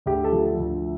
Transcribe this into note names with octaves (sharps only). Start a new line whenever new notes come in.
D2 G4
A4
F3
D2